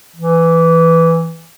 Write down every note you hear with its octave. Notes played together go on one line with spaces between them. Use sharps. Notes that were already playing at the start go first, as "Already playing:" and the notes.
E3